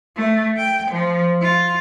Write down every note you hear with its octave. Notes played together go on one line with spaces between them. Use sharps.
A3
G5
F3
F4